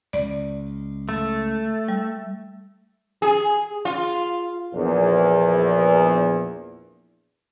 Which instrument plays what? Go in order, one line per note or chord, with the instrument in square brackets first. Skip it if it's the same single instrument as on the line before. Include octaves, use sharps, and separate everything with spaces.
[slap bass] C#2 [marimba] D5
[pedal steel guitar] A3
[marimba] G3
[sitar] G#4
F4
[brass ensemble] A#1 E2